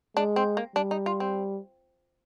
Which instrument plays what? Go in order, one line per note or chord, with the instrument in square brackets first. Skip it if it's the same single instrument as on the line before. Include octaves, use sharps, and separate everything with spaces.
[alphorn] G#3 [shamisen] D4
[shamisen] C4
A#3
[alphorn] G3 [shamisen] D4
[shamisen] D#4
F4
C4